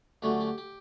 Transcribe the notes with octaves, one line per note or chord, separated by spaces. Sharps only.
D2 D3 F#3 A3 C#4 G4
G4
G4